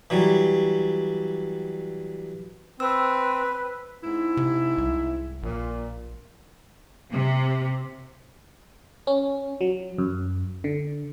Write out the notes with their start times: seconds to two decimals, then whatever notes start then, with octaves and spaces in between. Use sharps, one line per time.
0.10 E3 F#3 G3
2.80 C4 B4 E6
4.03 G#2 C4 E4
4.37 C3
4.78 C2
5.43 A#1 A#2
7.12 C3
9.07 C#4
9.61 F#3
9.98 F#2
10.64 D3